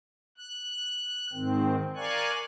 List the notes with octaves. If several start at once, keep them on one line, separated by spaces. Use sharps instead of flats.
F#6
G#2 D#3 C4
A#4 D5 F5 G#5 C#6 F#6